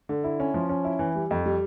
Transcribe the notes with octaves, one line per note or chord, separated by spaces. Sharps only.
D3
E4
C#4
F3
C#4
E4
E3
G3
F2
G3